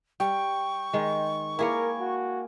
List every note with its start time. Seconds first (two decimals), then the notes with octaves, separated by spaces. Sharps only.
0.20 G3 G5 C#6
0.93 D#3 G#3
1.59 A#3 E4 G#4 A#4 C#5 G#5
2.00 F#4